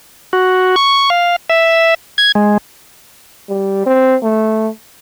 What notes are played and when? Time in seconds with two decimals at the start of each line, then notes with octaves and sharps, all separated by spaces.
0.33 F#4
0.76 C#6
1.10 F5
1.50 E5
2.18 G#6
2.35 G#3
3.49 G3
3.86 C4
4.23 A3